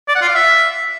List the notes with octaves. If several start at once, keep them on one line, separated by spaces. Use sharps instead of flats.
D5
F#5
F4
F5
E5